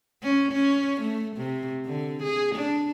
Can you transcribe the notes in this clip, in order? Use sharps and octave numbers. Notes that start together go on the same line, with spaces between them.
C#4
C#4
A3
C3
D3
G#4
D4